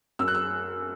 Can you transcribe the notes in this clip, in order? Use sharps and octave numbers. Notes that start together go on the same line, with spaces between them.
F#2 E6
F#6
E6